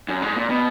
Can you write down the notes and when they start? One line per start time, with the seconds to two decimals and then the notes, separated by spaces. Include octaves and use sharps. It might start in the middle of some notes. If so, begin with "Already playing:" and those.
0.09 F#2
0.22 G#2
0.36 A#2
0.49 B2